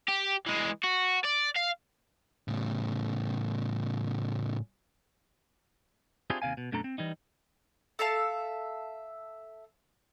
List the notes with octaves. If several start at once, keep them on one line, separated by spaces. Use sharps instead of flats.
G4
E3 G#3
F#4
D5
F5
A2 C#3
C4 D4 E4 F4 G4 G#4
D#2 C3 F5 G#5
B2
F#2 B2 A3 D4 A4 A#5
C4
E3 G3 D#4
A4 E5 F5 A5